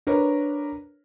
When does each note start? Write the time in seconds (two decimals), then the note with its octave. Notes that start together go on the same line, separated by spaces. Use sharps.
0.07 D4 A#4 B4 C#5